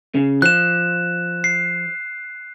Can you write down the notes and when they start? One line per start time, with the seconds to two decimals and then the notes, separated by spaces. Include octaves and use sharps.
0.15 C#3
0.42 F3 F#6 E7
1.44 C7